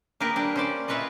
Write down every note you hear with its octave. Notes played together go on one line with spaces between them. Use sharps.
A#3 G4 G#4 A#4 B4
G3 D4
C#4 C5 D5
E4 F4 B4 C#5 D#5